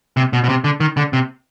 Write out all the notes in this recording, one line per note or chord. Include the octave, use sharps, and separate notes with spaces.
C3
B2
B2
C3
D3
D#3
D3
C3